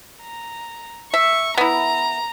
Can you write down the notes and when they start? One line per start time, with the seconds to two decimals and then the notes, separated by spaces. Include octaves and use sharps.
0.22 A#5
1.14 E5 C#6
1.58 B3 E4 A#5